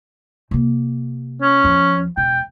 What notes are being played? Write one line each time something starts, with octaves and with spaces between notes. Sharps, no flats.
C3 A#3
C#4
E2 F3
E1 G5